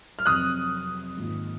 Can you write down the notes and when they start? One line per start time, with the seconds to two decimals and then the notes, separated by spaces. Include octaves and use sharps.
0.19 F6
0.26 F2 C3 F#3 D#6 F#6
1.17 G#2 D#3 A#3 F4